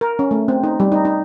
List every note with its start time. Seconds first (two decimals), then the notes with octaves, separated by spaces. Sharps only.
0.01 A#4
0.19 C#4
0.31 A3
0.48 C4
0.63 D#4
0.80 G3
0.92 D#4
1.05 D#4